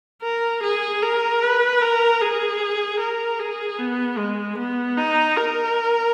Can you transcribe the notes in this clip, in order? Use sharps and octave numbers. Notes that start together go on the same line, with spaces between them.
A#4
G#4
A#4
B4
A#4
G#4
A#4
G#4
B3
G#3
B3
D#4
A#4